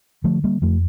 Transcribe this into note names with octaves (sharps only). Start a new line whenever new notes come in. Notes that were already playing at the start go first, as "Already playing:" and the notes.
D3 F3 A3
G3 A#3
F2 F3 A3